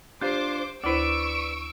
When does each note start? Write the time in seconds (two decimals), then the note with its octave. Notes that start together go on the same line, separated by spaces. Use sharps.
0.22 D4 F4 G4 C5 D6
0.84 D2 E4 B4 C5 D5 C#6 E6 D7